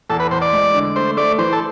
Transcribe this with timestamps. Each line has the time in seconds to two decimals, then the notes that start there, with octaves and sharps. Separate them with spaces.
0.10 E2 A4
0.20 B4
0.31 E2 C5
0.42 D5
0.53 G#3
0.74 D3
0.96 A3 C5
1.17 A3 D5
1.38 E3 C5
1.53 A4